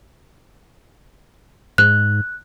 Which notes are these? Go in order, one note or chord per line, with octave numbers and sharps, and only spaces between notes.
G#2 F#6